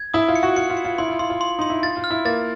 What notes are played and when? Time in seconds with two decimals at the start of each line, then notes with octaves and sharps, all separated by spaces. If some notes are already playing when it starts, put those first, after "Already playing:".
Already playing: G#6
0.14 E4 D#6
0.28 F4
0.36 C#7
0.43 F#4
0.56 F4 C#7
0.70 F4
0.77 C#7
0.85 F4
0.98 E4 C6
1.08 F4
1.19 F4 C6
1.30 F4
1.41 C6
1.59 D#4 C6
1.70 E4
1.83 F4 A6
1.97 F4
2.04 F6
2.11 E4
2.25 A#3 A6